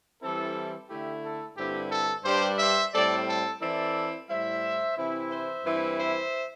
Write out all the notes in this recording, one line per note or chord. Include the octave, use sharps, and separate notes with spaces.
E3 G3 C4 E4 A4
D3 A3 E4 G4
A4
G2 D3 C4 E4 G4
A4
G2 G3 D4 G4 C5
C5 E5
A2 G3 C4 A4 D5
A4
E3 C4 E4 A4 D5
A2 G3 E4 C5 E5
C3 E3 C4 E4
C5 E5
G2 E3 C4 E4
C5 E5